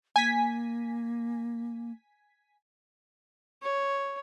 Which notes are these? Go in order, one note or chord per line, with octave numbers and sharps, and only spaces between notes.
A#3 G#5 B6
C#5